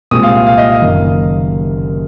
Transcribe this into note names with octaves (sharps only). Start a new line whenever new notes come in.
C2 A#2 G#3 C4 D#6
F5
F5
F5
D#5
F5
F#1 F#2 D#3 A#3